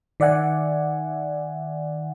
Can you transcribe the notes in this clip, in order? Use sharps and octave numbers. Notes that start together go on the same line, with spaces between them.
D#3 D5 E5 F#5 G#5